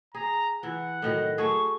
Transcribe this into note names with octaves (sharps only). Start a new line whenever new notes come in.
G#4 A#5
E3 E4 F#5
A2 D#3 F#3 D#5
A3 F#4 G#4 C#6